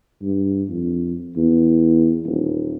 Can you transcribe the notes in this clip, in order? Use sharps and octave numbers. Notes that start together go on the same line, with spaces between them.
G2
F2
E2
D#1